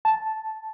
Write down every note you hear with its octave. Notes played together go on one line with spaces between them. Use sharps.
A5